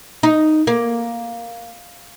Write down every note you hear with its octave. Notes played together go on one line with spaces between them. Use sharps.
D#4
A#3